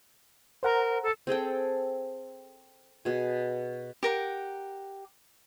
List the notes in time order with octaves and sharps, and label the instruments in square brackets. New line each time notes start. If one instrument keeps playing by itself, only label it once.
[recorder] A#4 [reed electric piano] C5 F#5 A#5
[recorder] A4
[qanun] C4 G#4 A4 G5
B2 G#4
[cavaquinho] G4 A#4 F#5